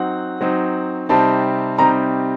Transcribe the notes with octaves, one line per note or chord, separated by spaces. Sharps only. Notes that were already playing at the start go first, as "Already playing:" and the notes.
Already playing: F#3 C4 D#4 F#5
F#3 C4 D#4
C3 G3 C4 D#4 A5
C3 G3 C4 D#4 A#5